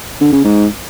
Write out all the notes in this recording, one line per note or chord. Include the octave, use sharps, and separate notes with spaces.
D3
C#3
G#2